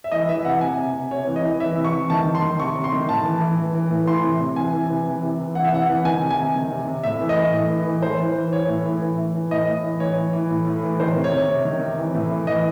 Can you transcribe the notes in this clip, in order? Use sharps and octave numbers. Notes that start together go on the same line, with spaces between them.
E5
E3 D#5
E3 E5
C3 F#5
C3 G#5
C3
C3
C3 C#5
E3
D#5
E3
E3 E5
C3
C#6
E3
D#3 A5
D#3
C6
D#3
C3 C#6
C3
C6
D#3
A2 A5
E3
E3
E3
E3
A2
E3 C6
C3
C3
E3 G#5
E3
C3
E3
C3
E3
E3 F#5
E5
C3 F#5
E3
D#3 G#5
C3
G#5
C3
D#3
C3
C3
A2 E5
E3
D#5
E3
A2
E3
E3
E3 C5
E3
E3
E3 C#5
A2
E3
E3
E3
E3
A2 D#5
A2
E3
E3 C#5
E3
E3
A2
A2
E3
D#3 C5
C3
C#5
C3
C3
D#3
C3
E3
A2
E3
E3 D#5